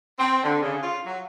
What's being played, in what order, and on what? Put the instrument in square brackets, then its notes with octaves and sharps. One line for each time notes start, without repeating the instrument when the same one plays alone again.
[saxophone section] C4
D3
C#3
F4
F#3